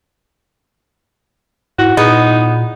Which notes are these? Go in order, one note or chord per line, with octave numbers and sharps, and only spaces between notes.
G#2 E4 F#4
A#2 B3 D#4 G#4